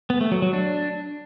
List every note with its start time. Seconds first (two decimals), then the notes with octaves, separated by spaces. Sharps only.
0.10 B3
0.21 A3
0.32 F#3
0.42 F#3
0.53 D4